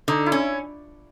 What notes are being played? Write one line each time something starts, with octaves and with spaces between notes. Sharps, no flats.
D3 D#4
E4
C#4